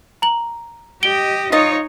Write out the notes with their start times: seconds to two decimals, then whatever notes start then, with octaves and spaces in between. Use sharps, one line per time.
0.22 A#5 F#7
1.03 G4 D#5 D7 G7
1.52 D#4 F4 C#5 D#5